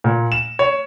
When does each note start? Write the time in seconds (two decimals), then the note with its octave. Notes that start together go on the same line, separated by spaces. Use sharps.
0.04 A#2
0.32 E7
0.59 C#5